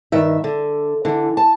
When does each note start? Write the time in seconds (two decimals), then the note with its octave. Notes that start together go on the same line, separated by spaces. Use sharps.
0.12 G2 D#3 E5
0.44 D3
1.05 D3 E3
1.37 A5